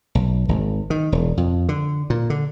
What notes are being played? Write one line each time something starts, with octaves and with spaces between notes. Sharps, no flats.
B1
G#1
D#3
E1
F2
D3
A#2
D3